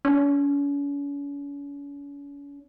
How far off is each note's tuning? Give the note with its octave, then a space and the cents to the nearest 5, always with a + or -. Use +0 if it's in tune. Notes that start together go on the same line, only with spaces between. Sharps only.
C#4 +40